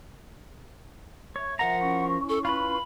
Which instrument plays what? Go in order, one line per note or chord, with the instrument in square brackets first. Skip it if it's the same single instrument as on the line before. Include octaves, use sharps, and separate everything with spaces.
[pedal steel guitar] C#5 [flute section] E5
[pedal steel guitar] F3 A#4 A#5 [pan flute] F#5
[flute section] C#4 E4 C#6
[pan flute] A4
[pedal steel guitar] F4 B4 [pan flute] B5